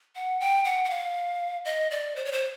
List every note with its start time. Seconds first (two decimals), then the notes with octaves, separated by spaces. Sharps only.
0.15 F#5
0.40 G5
0.65 F#5
0.85 F#5
0.90 F5
1.65 D#5
1.91 D5
2.16 C5
2.25 C#5
2.32 C5